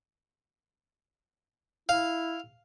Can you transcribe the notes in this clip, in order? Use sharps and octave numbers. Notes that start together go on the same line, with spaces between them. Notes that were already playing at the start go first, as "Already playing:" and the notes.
E4 F5